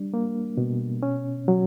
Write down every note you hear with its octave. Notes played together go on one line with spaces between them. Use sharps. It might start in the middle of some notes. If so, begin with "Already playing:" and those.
Already playing: G3 D4
A#3
B2
C#4
F#3